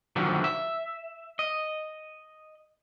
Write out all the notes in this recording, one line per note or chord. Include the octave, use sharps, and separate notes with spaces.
D3 D#3 F3 F#3
E5
D#5